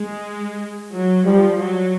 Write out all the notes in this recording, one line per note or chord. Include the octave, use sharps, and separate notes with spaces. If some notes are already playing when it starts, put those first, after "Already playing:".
Already playing: G#3
F#3
F3 G3
F#3